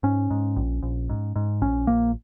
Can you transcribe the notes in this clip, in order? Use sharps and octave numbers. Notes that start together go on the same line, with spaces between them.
G#2 C#4
G#2
A#1
A#1
G#2
G#2
A#1 C#4
A#1 A#3